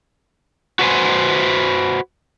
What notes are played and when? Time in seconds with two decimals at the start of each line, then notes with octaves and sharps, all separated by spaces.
0.79 F#4 A4 B4 C5 G#5